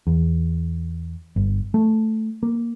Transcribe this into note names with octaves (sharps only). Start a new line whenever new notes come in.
E2
G1
A3
A#3